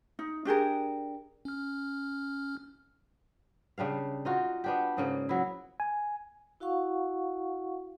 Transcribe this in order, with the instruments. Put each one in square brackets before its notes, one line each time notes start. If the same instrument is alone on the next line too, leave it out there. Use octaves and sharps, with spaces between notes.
[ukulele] D#4
D4 G4 G#4 A#4
[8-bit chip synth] C#4 F6
[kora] C#3 G3 D4 F5
D#4 F4 F#4
B3 D4 G4
G#2 C#3 A#3
F#3 E4
[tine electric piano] G#5
[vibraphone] E4 F#4 F5 F#5 C#6